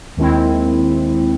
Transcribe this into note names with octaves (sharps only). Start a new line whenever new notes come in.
D#2 D#3 G#3 C4 E4